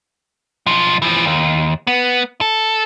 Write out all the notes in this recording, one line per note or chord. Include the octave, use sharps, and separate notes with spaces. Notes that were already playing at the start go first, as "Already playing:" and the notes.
B1 F3
E3 F3
D#2
B3
A4